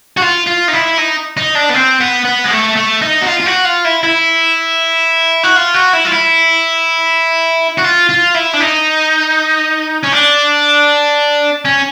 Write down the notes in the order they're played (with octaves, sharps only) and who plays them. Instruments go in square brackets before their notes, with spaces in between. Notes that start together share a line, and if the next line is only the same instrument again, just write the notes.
[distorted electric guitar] F#4
F4
F4
D#4
E4
D#4
D#4
D4
B3
C4
B3
B3
G#3
A3
A3
D#4
F#4
F4
F4
F#4
F4
E4
E4
F#4
F4
F#4
E4
F4
E4
F#4
F4
F4
E4
D4
D#4
C#4
D4
C#4